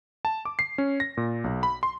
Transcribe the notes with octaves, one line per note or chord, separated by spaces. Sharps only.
A5
D6
C7
C#4
A#6
A#2
B1
B5
C6